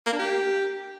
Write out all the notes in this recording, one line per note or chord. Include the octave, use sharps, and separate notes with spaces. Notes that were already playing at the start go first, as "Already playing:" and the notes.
A#3
D4
G4